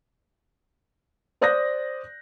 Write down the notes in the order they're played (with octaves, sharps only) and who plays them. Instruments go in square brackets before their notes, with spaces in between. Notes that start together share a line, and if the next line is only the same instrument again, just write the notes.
[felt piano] C5 D5 D#6 F#6 G6 A#6